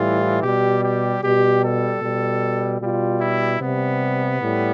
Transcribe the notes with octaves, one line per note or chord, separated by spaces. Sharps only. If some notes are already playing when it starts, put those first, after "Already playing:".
Already playing: A2 E3 G3 F4
B2 G3 G4
G4
B2 G3 G4
A4
B2 G3
B2 G3 F4
E4
C3 G3 B3
A2 G3